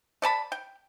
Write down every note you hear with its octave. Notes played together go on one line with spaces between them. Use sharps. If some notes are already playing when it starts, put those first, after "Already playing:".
A3 D5 A5 B5
G5